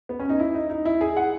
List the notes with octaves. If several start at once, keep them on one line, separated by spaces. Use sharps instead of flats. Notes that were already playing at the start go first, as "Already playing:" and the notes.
B3
C#4
D#4
E4
D#4
D#4
E4
G#4
F#5